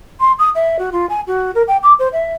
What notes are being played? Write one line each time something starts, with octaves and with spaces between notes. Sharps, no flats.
C6
D#6
E5
F#4
F4
G#5
F#4
A#4
G5
D6
C5
E5